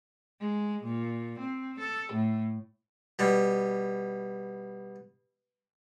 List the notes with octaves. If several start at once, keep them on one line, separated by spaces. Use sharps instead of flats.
G#3
A#2
C4
A4
A2
B2 G3